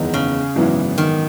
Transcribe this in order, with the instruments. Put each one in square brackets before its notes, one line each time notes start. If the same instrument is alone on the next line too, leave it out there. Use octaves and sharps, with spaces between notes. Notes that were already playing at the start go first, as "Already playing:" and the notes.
Already playing: [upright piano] F#1 E2 D#3 G#3 B3
[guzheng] C#3
[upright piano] G#1 F#2 E3 B3 E4
[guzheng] D#3